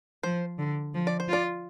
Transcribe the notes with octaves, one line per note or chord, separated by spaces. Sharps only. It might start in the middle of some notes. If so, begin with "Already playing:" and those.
F3 C5
D3
F3
D5
C5
F4 D5